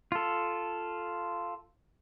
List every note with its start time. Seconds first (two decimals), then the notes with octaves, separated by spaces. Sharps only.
0.12 F4 A4